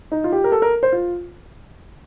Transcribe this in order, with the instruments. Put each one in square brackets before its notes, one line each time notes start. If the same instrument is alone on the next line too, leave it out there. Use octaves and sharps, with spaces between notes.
[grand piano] D#4
F4
G4
A#4
A4
A#4
C5
F4